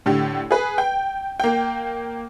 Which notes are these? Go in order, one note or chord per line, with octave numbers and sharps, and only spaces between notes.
A2 D3 G4
G#4 B4
G5
A#3 G5